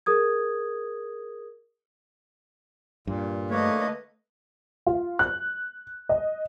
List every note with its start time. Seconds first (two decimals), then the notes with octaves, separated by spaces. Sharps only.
0.06 G#4 A#4 D#6 G#6
3.07 G2 A#2
3.51 D3 A3 A#3 B4 C#5 D#5
4.87 F4
5.19 F#6
6.09 D#5